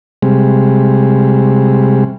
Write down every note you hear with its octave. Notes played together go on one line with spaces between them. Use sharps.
C3 G3 G#3